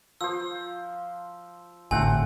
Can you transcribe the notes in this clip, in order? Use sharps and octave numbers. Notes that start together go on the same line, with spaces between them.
F3 C5 E6
G#1 A2 D3 A3 C4 F#5 G#5